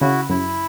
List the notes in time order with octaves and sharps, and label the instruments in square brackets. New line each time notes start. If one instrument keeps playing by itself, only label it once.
[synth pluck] C#3 [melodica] E4 F#4
[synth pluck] F#2 [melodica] E4